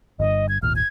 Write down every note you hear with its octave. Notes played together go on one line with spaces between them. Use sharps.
G1 G2 D#5
G#6
G#1 D#2 A#2 F6
G#6